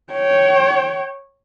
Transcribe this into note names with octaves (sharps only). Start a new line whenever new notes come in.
C#5 G5